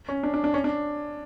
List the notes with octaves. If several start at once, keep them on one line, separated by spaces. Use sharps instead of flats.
C#4
D4
D4
D4
C#4
D4